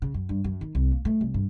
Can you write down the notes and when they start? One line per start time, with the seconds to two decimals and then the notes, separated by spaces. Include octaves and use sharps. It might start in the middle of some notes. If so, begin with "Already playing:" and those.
0.02 C#3
0.14 F#2
0.29 G2
0.44 F#2
0.61 D#3
0.75 C2
0.91 A#3
1.05 A3
1.21 C2
1.34 G2